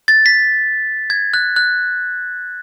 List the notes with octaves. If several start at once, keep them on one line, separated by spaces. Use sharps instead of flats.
A6
B6
G#6
F#6
F#6